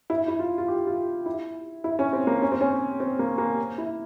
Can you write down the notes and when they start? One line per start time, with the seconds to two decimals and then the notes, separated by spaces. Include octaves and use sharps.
0.10 E4
0.28 E4
0.39 F4
0.58 F4
0.68 G4
0.87 F4
1.26 E4
1.84 E4
1.99 C#4
2.13 C4
2.27 A#3
2.42 C#4
2.52 C4
2.61 C#4
3.00 C4
3.19 A#3
3.38 A#3
3.78 E4